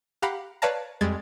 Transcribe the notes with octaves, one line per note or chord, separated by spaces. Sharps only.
G4 F5 F#5 A#5 B5
B4 C#5 D5 F5 A5 A#5
F2 G3 G#3 G#6 A6